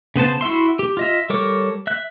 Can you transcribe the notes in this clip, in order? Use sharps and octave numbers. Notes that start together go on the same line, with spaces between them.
C#3 B3 C5 A5
E4 F#4 E5 C6
G4
F4 D#5 E5
G3 A4 A#4 C#5 D6
E5 F#6